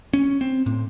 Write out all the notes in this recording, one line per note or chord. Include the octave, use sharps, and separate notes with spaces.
C#4
C4
A2